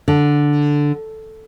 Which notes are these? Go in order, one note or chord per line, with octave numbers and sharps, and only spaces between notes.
D3